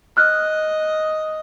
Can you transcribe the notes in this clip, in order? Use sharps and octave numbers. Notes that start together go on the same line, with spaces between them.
D#5 F6 F#6